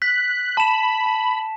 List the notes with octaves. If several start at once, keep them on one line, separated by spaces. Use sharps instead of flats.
F#6 B6
A5 B5 E7
A5